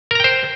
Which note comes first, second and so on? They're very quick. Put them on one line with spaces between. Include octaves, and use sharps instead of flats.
A#4 A#5 G5 C5